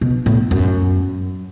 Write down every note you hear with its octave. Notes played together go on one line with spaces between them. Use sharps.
B2
A2
F#2